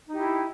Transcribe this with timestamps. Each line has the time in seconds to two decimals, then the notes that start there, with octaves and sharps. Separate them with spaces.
0.08 D#4
0.12 G4
0.16 E4